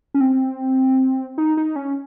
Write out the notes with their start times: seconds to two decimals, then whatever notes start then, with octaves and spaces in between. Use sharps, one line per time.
0.14 C#4
0.21 C4
1.38 D#4
1.57 D#4
1.76 C#4